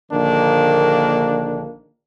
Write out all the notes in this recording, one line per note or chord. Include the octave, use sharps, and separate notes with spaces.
A#1 D3 D#3 A#3 D4